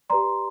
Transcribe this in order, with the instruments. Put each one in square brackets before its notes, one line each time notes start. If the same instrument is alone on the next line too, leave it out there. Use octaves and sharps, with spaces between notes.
[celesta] G4 B4 D5 A#5 C6